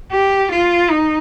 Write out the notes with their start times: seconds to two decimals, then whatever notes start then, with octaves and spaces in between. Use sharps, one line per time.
0.11 G4
0.51 F4
0.90 D#4